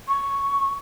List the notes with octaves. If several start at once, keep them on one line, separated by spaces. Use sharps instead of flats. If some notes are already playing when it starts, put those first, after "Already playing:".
C#6